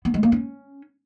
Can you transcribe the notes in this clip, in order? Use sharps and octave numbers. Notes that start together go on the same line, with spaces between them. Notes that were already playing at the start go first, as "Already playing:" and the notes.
B3
G#3
A#3
C#4